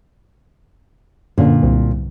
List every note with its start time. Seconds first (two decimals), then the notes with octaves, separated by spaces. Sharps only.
1.38 F#2 A#2 D3
1.63 C2